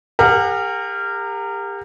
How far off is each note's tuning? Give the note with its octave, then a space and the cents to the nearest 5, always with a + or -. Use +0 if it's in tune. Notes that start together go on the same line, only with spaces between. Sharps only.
G4 +35 A#4 -20 F#5 -25